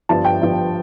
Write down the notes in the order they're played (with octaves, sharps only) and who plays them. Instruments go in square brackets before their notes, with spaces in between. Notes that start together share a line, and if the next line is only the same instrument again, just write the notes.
[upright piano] G1 G2 F3 A5
G5
G1 G2 F3